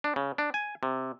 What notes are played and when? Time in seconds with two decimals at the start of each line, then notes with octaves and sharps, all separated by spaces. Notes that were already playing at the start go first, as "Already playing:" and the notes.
0.04 D4
0.16 C#3
0.38 D4
0.54 G#5
0.83 C3